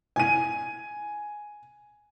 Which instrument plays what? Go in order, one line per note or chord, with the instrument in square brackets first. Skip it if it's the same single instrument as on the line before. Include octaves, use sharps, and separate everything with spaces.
[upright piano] G#5 D#7